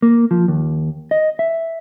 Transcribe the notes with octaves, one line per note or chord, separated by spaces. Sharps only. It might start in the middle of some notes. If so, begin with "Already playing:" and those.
A#3
F3
D#2
D#5
E5